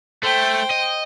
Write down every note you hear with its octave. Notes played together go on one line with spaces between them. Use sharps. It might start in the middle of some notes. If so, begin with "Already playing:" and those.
A3 C5 G5
D#5